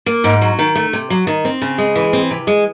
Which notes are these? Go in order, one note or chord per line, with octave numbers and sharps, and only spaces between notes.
A#3
G#2
F#3
D#3
A3
C3
F#3
D#3
C4
C#3
G#3
E3
C4
C3
G#3